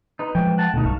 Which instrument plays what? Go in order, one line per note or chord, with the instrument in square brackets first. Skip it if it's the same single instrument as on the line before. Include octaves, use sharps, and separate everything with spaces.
[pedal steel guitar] D#4 B4
[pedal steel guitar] E3 G5 [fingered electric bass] F3 G#3
[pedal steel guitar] F#5 A5
[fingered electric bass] D2 B2 [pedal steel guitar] A3 D#4
[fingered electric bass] B1 G2 [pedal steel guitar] F5 A5 C#6